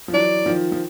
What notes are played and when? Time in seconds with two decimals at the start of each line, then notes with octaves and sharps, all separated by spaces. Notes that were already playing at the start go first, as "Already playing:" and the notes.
0.08 F3
0.13 E3 F#3 D5
0.46 D#3 F3
0.72 F3